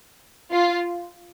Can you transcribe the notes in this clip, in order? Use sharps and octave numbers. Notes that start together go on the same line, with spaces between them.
F4